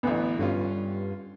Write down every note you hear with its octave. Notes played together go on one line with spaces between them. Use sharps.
A1 D2 B3
G2 D3 C#4 F4